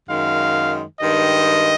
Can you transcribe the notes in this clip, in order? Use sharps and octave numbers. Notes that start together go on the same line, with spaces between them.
F#2 D#3 G#3 F5
G2 D#3 G#3 D#5